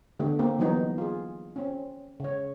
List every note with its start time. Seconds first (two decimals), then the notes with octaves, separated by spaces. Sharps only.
0.20 D3 A3 B3 G4
0.39 A#3 C4 G4
0.59 E3 F#3 G3 B3 D#4
0.98 F4 G#4
1.56 C4 C#4
2.20 C#3 C#5